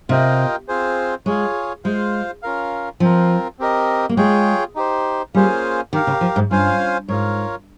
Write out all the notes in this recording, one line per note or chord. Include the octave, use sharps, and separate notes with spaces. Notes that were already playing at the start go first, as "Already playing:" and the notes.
C3 F4 A#4 D#5 G5
C4 F4 G#4 C5
G#3 F4 G#4 C#5
G#3 F4 C5 F5
C#4 F4 A#4 F5
F3 C4 F4 A#4
C4 G4 A#4 D#5
A#3
G#3 F4 G#4 C#5 G5
D#4 G4 C5
G3 A#3 C#4 F4 G#4 C5
D#3 G4 A#4 F5
C#3
F3
G#2
G2 C#4 F4 C5 F5 G#5
G#2 F4 A#4 C#5